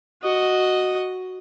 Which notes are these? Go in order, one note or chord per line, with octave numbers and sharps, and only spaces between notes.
F#4 D#5